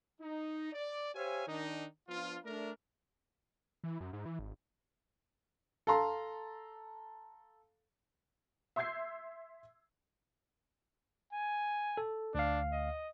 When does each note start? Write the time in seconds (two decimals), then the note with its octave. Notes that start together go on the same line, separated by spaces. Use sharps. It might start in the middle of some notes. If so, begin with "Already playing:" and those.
0.21 D#4
0.73 D5
1.15 G4 C5 C#5 E5 F5 G#5
1.48 D#3 D4 D#4
2.08 F3 B3 D4 F4
2.45 A3 D4 A#4
3.84 E3
4.01 F#2
4.13 G#2
4.26 E3
4.39 G#1
5.87 A4 F5 A#5 C6
8.76 E5 C6 E6 G6 G#6 C7
11.33 G#5
11.97 A4
12.35 D2 D4 F5
12.72 D#5